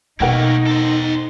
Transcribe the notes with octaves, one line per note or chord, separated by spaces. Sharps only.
B2 A3 A#3 D#4 A#4 F#5 G5
A4 C5